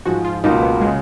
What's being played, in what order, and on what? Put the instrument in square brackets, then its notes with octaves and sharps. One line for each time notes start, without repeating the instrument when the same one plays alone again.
[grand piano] G#2 F3 G#3 [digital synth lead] F#4
[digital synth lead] F4
[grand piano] C#2 B2 A#3 F4 [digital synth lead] D#4
[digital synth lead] B3
[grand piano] C#3 [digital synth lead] G#3